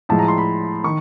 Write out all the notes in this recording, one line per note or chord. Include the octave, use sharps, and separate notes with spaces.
A2 F3 G#3 A5
A#5
C6
B5
D#3 C#6